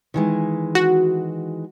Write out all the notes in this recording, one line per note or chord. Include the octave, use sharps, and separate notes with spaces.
D#3 E3 G#3
F#4